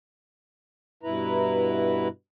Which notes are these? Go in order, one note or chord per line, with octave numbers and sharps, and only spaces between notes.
G2 B2 E4 B4 A#5